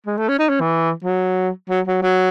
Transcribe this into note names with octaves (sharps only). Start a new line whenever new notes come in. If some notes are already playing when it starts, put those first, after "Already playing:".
G#3
A3
C#4
D#4
C#4
E3
F#3
F#3
F#3
F#3